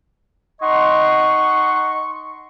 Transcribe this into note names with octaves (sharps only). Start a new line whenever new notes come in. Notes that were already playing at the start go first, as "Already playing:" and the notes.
D#4 D#5 F#5 C6 C#6